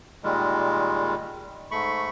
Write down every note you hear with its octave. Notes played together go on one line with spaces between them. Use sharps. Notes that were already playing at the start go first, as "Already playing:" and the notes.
A#2 D#3 G3 G#3
G#2 A3 B5 C#6